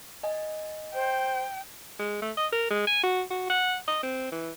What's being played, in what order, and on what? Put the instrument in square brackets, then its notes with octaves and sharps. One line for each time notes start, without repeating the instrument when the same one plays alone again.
[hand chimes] D#5 G#5
[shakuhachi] C5 [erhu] G5
[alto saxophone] G#3
A3
D#5
A#4
G#3
G#5
F#4
F#4
F#5
D#5
C4
E3